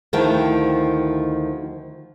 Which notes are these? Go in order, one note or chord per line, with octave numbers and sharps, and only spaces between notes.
D2 D#3 F3 E4 G5